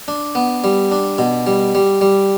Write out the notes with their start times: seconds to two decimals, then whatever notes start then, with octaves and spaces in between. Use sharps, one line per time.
0.08 D4
0.35 B3
0.64 G3
0.92 D4
1.18 B2
1.46 G3
1.75 G3
2.01 G3